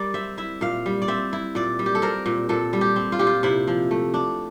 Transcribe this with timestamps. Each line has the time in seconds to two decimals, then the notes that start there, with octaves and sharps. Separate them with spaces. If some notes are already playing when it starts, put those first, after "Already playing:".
Already playing: G3 A#4 D5
0.14 C4 E5
0.38 E4 E5
0.61 A#2 F5
0.86 G3
1.02 D5
1.08 C4 E5
1.33 E4
1.55 A#2 D5
1.79 G3
1.86 G4
1.95 A4
2.02 C4 A#4
2.26 A#2
2.49 A#2 A4
2.73 G3
2.81 G4
2.96 C4
3.12 F4
3.19 A#2 G4
3.27 F4
3.43 C3 E4
3.68 F3
3.91 A3
4.14 D4